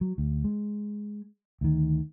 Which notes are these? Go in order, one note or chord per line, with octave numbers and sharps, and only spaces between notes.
F#3
D2
G#3
D2 D#3